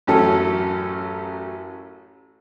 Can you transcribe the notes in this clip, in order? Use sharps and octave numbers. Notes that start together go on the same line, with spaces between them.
A1 F#2 A3 C#4 A4